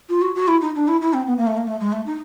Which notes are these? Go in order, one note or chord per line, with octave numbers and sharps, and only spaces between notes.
F4
F#4
F#4
E4
D#4
D4
E4
E4
C4
B3
A#3
A3
A#3
A3
G#3
A3
D#4